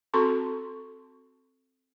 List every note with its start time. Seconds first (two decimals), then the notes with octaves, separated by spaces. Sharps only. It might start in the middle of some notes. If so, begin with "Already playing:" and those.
0.14 C4 F#4 A4 A5 C6 C#6